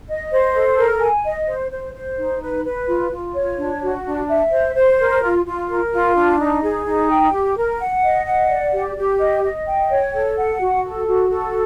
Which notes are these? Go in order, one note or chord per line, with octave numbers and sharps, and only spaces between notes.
D#5
C5
A4
A#4
G#5
D#5
C5
C5
C5
D#4
B4
B4
F4
F4
C#5
D4
F#4
D4
E5
C5
C5
A#4
F4
F4
A#4
F4
D4
D#4
G#4
D#4
G5
G4
A#4
F#5
D#5
F#5
D5
G4
G4
D#5
D#5
G5
C#5
A4
F#5
F#4
A4
F#4
A4